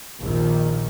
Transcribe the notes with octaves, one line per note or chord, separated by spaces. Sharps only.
A#1 D#2 A#2 D#3